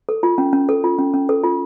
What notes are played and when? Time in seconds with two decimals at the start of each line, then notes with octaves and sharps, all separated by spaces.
0.09 A4
0.23 F4
0.38 C#4
0.53 C#4
0.69 A4
0.84 F4
0.99 C#4
1.14 C#4
1.29 A4
1.44 F4